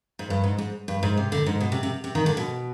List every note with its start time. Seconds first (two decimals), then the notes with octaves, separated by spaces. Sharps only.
0.19 G#2
0.30 G2
0.44 G#2
0.58 G#2
0.88 G2
1.03 G#2
1.17 C3
1.32 D3
1.46 G#2
1.60 B2
1.72 C3
1.83 C3
2.04 C3
2.15 D#3
2.26 D3
2.37 B2